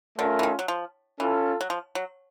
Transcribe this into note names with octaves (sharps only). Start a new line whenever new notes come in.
D3 A3 C#4 F4 A#4
E3
D#3
F#3
F3
E3 C#4 F4 A4
F#3
F3
F#3